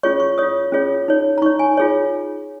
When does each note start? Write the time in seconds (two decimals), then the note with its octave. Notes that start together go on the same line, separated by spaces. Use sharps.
0.03 C#4 F4 G#4 C#5 C#6
0.20 C#6
0.38 F4 C#5 D#6
0.72 C#4 F4 G#4 C#5
1.08 D#4 C#5
1.38 A#5
1.42 D#4 C#5 C#6
1.59 G#5
1.77 F4 G#4 C#5